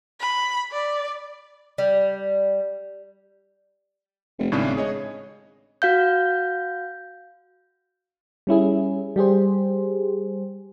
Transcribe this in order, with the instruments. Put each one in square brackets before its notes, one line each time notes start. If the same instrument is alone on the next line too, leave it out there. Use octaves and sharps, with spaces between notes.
[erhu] B5
D5
[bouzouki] G3
[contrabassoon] F1
[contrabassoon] G#1 [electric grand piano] A2 C#3 D4
[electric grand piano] G#4 C#5 D#5
[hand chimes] F#4 F5 G6
[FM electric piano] G3 C#4 E4 G#4
G3 G4 G#4 C5